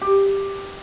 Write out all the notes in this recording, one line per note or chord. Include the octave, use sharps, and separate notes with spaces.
G4